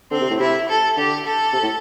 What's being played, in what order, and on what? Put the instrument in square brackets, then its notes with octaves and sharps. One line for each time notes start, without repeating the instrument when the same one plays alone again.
[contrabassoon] D3 [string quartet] C4
[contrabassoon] C3
A2
[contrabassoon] C3 [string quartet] E4
[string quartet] A4
[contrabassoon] D3 [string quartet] G4
[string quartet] A4
[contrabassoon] C3
A2